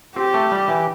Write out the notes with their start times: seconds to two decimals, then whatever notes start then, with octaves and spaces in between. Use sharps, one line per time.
0.16 C4 G4
0.34 A3
0.52 G3
0.68 E3